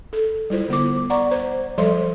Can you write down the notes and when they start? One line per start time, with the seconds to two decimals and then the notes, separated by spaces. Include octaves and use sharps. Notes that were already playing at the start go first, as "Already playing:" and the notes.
0.13 A4
0.50 G3 E4 F4 C5
0.69 D3 B3 C5 D6
1.10 D5 F#5 A#5 C#6
1.31 C5
1.78 F3 G3 A4 C5 E5 C6